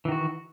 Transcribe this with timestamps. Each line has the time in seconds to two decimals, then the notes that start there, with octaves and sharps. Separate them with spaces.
0.05 E3
0.08 D#3
0.12 F#4